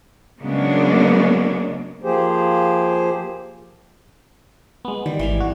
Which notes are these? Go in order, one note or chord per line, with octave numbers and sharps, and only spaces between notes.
C#3 F#3 G#3 A#3 B3 D4
F3 A#3 G4 G#4 C5
G#3 B3
D#3 G3
G#1 E3 E5 F5
F#4